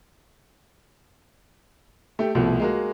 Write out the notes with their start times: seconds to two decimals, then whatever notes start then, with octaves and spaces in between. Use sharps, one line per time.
2.19 A3 G4
2.35 C2 B2 F3 A3
2.60 G#3 A#3 F#4